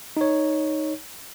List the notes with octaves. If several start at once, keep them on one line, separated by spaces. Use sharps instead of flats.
D#4 C#5